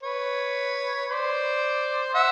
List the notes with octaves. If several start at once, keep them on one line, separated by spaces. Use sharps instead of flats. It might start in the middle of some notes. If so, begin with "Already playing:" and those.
B4 C#5
C5 D5
E5 F#5